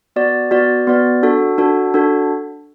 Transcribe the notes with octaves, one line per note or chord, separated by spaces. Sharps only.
B3 F#4 D5
B3 F#4 D5
B3 F#4 D5
D4 F#4 A4
D4 F#4 A4
D4 F#4 A4